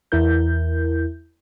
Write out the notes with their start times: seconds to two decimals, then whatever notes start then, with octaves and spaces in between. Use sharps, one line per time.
0.12 E2 E4 A#4 G6